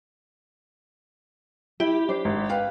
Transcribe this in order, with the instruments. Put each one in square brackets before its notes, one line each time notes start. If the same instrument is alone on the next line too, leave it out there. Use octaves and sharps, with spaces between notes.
[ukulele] E4 [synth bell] G4
[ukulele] D4 C5
[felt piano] G#1
B4 F5 G5